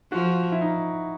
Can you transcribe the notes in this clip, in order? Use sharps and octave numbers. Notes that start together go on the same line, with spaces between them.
F3 F#4
E4
D#4